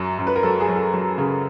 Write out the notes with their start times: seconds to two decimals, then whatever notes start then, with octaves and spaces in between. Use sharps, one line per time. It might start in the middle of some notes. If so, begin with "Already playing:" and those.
Already playing: F#2 F#3
0.19 F#2
0.27 B4
0.35 A#4
0.43 F#3 A4
0.60 G#4
0.68 F#3
0.76 A4
0.93 F#3
1.18 C#3